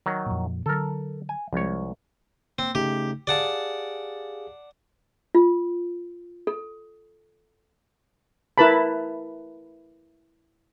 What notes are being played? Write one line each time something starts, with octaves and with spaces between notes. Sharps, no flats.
D#3 F#3
F2 A#2
D3 F#3 A4 A#4
G#5
C2 F3 G#3 C#5
A#3 C4
C#3 A3 D#4 G4
G4 G#4 D5 F5 F#5 A5
F4
A4
E4 A#4 B4 A5 B5